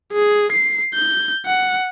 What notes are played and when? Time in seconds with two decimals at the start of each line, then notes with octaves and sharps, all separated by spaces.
0.13 G#4
0.52 C7
0.94 G6
1.46 F#5